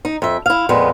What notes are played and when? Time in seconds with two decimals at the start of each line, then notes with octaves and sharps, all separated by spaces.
0.05 D#4
0.22 F2 E5
0.46 E4 F5
0.69 F2 A#2 G#3 B3